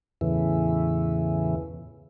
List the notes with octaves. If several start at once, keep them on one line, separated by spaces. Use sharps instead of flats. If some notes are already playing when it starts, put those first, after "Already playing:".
E2 A2 C#3 E3